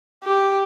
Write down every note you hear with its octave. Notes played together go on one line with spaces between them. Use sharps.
G4